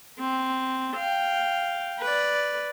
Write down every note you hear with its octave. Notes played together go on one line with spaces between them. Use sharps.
C4
F5 G5
B4 D5